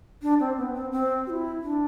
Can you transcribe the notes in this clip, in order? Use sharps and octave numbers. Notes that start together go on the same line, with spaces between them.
D4
C4
B3
C4
C4
F#4
E4
D4